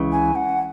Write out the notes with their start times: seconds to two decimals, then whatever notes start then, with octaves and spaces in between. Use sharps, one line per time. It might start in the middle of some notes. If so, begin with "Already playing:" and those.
Already playing: C#2 C#3 E3
0.12 G#5
0.35 F#5